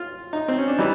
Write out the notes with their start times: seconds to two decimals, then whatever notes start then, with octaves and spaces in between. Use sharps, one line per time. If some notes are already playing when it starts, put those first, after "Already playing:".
Already playing: F4
0.33 D#4
0.48 C4
0.58 C#4
0.68 D4
0.78 E3 G3 D#4